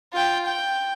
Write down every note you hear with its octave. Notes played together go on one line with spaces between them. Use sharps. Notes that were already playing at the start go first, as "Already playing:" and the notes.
F4 G5
G5